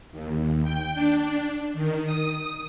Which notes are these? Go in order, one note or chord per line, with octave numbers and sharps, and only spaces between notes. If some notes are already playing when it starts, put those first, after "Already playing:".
D#2
G5
D4
D#3
D#6